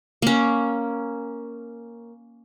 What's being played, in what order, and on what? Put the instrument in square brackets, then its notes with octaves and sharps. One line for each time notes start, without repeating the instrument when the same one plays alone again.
[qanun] A#3 C#4